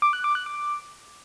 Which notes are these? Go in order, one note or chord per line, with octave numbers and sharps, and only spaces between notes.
D6
F#6
D6
F#6
D6